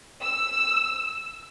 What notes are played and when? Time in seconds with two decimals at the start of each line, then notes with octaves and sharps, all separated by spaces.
0.21 E6